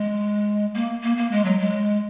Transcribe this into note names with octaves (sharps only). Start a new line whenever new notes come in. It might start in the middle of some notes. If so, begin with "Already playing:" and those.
Already playing: G#3
A#3
A#3
A#3
G#3
F#3
G#3